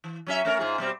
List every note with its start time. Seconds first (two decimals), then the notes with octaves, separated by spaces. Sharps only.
0.04 E3
0.27 F#3 C#4 E5
0.45 A3 C#4 A#4
0.59 G#2 F4 G#4
0.78 B2 G3 C4